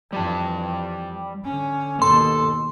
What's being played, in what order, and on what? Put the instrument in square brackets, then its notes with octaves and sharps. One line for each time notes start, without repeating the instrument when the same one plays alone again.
[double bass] F2 E3 [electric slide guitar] G3 G4 A5
[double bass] D3 C#4
[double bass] D#2 B2 [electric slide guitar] A4 [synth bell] C6